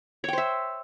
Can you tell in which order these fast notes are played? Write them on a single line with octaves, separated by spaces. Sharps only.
C#5 G5 C5 E5